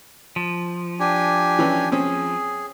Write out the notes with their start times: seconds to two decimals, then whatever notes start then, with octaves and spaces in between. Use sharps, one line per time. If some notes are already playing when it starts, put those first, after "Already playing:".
0.36 F3
1.00 D4 G4 G#5
1.59 E3 C#4
1.92 C4 C#4 G#4